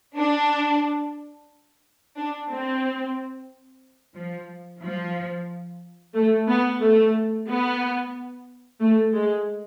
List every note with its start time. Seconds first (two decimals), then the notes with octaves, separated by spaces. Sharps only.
0.16 D4
2.16 D4
2.49 C4
4.15 F3
4.82 F3
6.15 A3
6.48 B3
6.81 A3
7.48 B3
8.80 A3
9.14 G#3